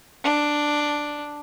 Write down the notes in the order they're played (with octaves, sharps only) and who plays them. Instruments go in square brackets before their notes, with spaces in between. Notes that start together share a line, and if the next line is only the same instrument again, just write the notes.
[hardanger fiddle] D4